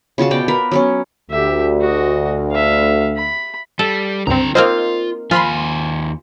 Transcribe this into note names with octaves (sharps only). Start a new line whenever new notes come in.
C#3 F4 F#4 A5
B2 D5 G5
A#4 B4 B5
F#3 B3 C#4
D2 G4 E5
F#4 D#5
E5 F5
B5
G3 A4
C#2 G2 D3 C4 A#5
A#3 C4 D#4 F4 C5 D#5 F6
D#2 F3 F4 G#5 B5 C6